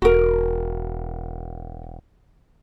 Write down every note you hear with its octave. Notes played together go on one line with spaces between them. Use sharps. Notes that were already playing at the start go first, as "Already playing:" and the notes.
E1 F#4 A#4